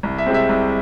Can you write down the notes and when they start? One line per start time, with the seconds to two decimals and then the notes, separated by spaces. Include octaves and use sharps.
0.03 C2
0.18 E5
0.26 C3 G#3 C4
0.34 E5
0.49 C2